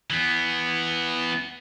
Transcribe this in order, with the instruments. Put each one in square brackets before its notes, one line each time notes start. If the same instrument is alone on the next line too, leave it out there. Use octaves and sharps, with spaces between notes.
[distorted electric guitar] E3 B3